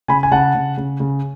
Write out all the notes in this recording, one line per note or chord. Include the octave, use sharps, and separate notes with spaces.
C#3 G#5 B5
G#5
C#3 F#5 A5
C#3
C#3
C#3